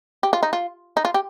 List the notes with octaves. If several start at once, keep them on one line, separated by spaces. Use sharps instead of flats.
G4
F4
D#4
F4
D#4
F4
G4